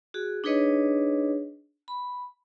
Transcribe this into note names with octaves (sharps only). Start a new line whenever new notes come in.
F#4 G#4
D4 D#4 G#4 B4 C#5 D#5
B5